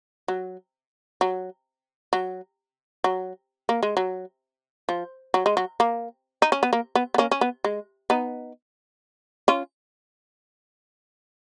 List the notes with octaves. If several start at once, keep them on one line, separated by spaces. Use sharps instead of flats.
F#3
F#3
F#3
F#3
A#3
G#3
F#3
F3
F#3
G#3
F#3
A#3
D#4
C#4
B3
A#3
B3
B3
A#3 C#4
C#4
B3
G#3
B3 D#4
C#4 F4